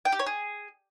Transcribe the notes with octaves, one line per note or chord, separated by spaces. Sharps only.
G5
G4
C#5
G#4